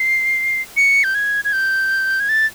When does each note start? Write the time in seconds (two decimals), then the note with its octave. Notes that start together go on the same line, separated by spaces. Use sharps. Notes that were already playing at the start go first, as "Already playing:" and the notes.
Already playing: C7
0.77 C#7
1.04 G6
1.15 G#6
1.45 G#6
1.53 G6
2.20 G#6
2.29 A6